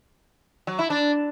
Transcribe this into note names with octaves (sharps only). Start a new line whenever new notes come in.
F#3
E4
D4